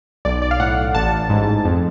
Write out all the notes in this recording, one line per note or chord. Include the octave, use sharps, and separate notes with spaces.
B1 D5
D5
F5
A2 F#5
A1 A5
G#2
F2